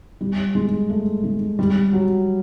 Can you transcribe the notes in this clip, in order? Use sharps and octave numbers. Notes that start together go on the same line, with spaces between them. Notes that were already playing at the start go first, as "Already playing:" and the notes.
G3
G#3
A3
G#3
G3
F#3